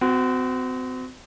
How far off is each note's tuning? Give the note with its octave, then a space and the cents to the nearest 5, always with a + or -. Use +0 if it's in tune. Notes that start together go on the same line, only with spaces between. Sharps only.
C4 -35 F#4 +0